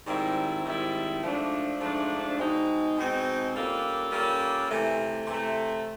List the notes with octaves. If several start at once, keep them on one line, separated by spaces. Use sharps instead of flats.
G#2 D#3 G3 C4 E4
G#2 D#3 G3 C4 E4
G#2 F3 A3 D4
G#2 F3 A3 D4
B2 G#3 C4 D#4
B2 G#3 C4 D#4
G3 A#3 C#4 F4 A4
G3 A#3 C#4 F4 A4
C3 E3 A3
C3 E3 A3